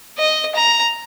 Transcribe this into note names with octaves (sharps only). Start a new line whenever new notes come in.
D#5
A#5